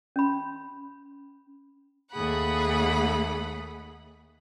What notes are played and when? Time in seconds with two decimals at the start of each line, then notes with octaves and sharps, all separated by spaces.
0.16 C#4 B5
2.11 D#2 A3 G#4 F#5 B5